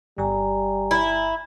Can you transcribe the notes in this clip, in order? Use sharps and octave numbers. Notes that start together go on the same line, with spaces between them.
G1 G3 G#5 A#5
E4